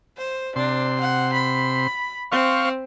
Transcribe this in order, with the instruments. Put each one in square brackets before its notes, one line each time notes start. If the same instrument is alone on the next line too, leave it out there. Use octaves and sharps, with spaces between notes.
[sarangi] C5
[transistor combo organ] C3 C6 [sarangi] D4
[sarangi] F#5
B5
[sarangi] C4 [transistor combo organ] C5 F5 C#6